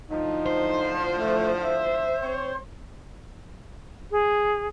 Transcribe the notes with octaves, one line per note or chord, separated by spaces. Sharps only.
A2 D3 F3 D#4
C5
A3
E5
C4 C#5
G#4